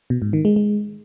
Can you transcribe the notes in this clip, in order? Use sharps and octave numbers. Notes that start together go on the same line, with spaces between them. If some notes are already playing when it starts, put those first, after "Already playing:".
B2
G#2
D#3
G#3
G#3